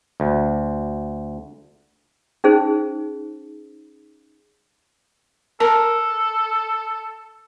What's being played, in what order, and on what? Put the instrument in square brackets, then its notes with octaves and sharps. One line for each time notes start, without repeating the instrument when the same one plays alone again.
[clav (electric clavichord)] D2
[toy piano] C#4 D#4 G#4 C5
[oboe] A4 [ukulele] A#4 [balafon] A5